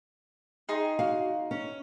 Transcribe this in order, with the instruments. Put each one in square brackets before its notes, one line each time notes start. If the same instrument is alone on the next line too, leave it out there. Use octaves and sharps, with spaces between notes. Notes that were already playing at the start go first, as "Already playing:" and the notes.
[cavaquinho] D#4 G#4 C6
[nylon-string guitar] F#4 F5
C#4